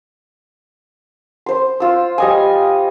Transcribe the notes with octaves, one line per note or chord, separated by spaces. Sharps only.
C5 C6
F4 E6
G3 D#5 G#5